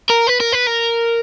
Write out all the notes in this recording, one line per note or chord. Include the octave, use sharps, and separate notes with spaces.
A#4
B4
A#4
B4
A#4